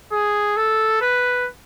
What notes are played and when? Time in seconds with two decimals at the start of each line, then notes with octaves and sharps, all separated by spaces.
0.12 G#4
0.56 A4
1.01 B4